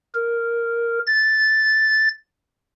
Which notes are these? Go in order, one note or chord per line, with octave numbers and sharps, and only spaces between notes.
A#4
A6